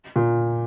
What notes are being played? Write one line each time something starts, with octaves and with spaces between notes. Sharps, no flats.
A#2